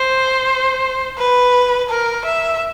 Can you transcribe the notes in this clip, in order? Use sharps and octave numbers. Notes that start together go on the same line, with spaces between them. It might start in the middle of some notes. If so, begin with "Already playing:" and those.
Already playing: C5
B4
A#4
E5